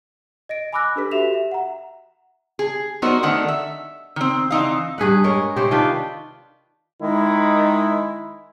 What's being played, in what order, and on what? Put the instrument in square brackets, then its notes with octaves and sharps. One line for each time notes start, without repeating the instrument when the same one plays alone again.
[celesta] D#5 A#6 D7
G#5 B5 D6 E6 F#6 A#6
D4 G4 A4 B4 B6
F#4 G4 E5 B6 E7 F7
E5
F#5 A#5
[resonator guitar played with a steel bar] G#4
F#3 B3 D#4 F#4 A#4 C5
D3 D#3 A3 F#5
E5
D#3 C4
E3 C4 D#4 F5
[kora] G2 G#4 B4 F#5
G#3 A#4 C#5
C3 C4 C5 C#5
D#3 D4 F4 B4
[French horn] D#3 [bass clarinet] G#3 [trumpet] E4